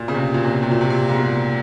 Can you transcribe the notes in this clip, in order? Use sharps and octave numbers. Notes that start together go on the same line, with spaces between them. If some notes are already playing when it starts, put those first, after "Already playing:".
Already playing: A#2
C#3
C3
A#2
C3
A#2
C3
A#2
C3
A#2
G#2
A#2